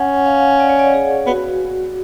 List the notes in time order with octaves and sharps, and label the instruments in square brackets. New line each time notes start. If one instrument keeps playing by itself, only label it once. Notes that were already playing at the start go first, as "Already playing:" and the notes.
Already playing: [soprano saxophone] C#4 [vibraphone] F#5
[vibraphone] F5
D5
C#5
D5
G#4
[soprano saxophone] B3 [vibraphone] F#4